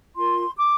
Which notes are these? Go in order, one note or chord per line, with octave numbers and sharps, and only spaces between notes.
F4 A#4 C6
D6